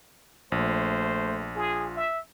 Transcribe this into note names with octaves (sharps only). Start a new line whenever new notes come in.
A#1 A3 C5
F4 G#4
E5